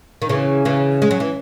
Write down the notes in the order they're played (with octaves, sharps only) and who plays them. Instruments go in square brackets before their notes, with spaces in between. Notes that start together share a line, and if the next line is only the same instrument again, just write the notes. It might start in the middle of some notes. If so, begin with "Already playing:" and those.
[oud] D#3
[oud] C#3 E3 [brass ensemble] C#4
[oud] C#3 E3
G#3
F#3
E3